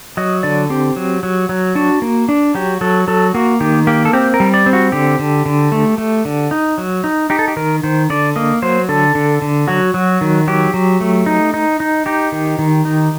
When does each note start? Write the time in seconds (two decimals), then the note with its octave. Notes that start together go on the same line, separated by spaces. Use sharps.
0.17 F#3 D#5
0.43 D3 D5
0.70 C4 G4
0.96 F#3
1.23 F#3
1.49 F#3
1.75 D4 F#4
2.02 A#3
2.29 D4
2.55 F#3 G4
2.81 F#3 A4
3.08 F#3 A4
3.34 A#3 F#4
3.60 D#3 G4
3.87 A#3 G4
4.05 A4
4.13 C4 G4
4.34 A#4
4.40 G3
4.54 D5
4.66 C4
4.73 F#4
4.92 D3 G4
5.19 D3
5.46 D3
5.72 A3
5.98 A3
6.25 D3
6.51 D#4
6.78 F#3
7.04 D#4
7.30 D#4 G4
7.39 A4
7.48 G4
7.57 D#3 A#4
7.83 D#3 C5
8.10 D3 D5
8.36 A#3 D#5
8.62 F#3 C5
8.89 D3 A4
9.15 D3
9.42 D3
9.68 F#3 F#4
9.94 F#3
10.21 D#3
10.48 F#3 G4
10.74 F#3
11.01 A3
11.26 D#4
11.54 D#4
11.80 D#4
12.06 D#4 G4
12.32 D#3
12.59 D#3
12.85 D#4